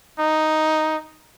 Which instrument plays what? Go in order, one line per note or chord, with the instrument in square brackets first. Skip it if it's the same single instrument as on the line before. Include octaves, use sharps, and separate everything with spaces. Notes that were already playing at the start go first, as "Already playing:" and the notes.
[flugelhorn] D#4